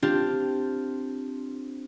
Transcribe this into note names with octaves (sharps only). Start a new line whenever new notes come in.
C4 D4 F4 G4